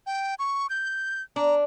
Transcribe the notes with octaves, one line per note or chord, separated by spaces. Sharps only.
G5
C#6
G6
D4 A#5